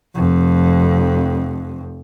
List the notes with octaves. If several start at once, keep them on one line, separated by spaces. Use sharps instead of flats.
F1 F2